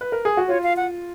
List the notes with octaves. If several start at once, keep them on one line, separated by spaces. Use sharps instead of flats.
B4
A#4
G#4
F#4
F4 C#5
F5
F#5